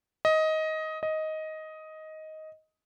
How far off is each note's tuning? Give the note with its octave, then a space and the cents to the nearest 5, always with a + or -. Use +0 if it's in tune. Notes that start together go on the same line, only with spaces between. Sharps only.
D#5 +15
D#5 +10